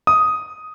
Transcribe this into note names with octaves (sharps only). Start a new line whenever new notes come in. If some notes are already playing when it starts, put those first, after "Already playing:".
D#6